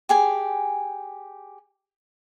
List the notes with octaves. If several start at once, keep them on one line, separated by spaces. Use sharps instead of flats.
G4 G#4 G#5